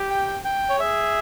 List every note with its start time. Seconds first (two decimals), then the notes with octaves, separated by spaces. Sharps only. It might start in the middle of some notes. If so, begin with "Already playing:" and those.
Already playing: G4
0.10 G5
0.45 G5
0.69 C#5
0.80 G#4 E5